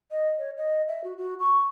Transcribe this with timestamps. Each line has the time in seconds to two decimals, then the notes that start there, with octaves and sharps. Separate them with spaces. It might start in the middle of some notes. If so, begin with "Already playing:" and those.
0.11 D#5
0.39 C#5
0.57 D#5
0.88 E5
1.04 F#4
1.18 F#4
1.40 C#6